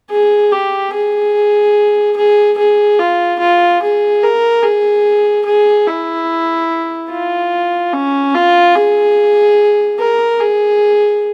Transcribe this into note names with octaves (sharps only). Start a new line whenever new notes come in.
G#4
G4
G#4
G#4
G#4
F4
F4
G#4
A#4
G#4
G#4
E4
F4
C#4
F4
G#4
A#4
G#4